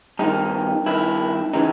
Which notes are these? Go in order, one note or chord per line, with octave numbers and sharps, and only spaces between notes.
G2 D#3 D#4
G2 D#3 E4
C#3 E3 D#4